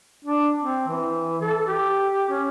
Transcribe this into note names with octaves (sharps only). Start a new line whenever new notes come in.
D4
C4
E3
A4
G4
C#4